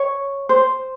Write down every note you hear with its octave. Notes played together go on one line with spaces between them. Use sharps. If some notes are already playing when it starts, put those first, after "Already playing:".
Already playing: C#5
C5